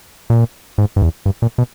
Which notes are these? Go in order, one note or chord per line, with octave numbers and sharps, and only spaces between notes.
A#2
G#2
G2
E2
G2
A#2
B2